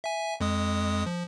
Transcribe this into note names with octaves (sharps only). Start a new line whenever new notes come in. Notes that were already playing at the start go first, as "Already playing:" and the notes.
E5 G#5
F2 G#3 D#6
F3